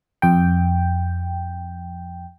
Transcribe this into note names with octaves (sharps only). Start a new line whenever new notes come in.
F2 G5